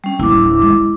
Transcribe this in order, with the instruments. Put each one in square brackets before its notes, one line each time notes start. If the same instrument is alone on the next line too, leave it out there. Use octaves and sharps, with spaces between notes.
[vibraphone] G3 C#4
[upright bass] D1 C#4 [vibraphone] E4 D6
[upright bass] G#3